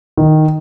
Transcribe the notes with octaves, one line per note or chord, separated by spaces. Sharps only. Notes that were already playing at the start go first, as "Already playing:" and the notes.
D#3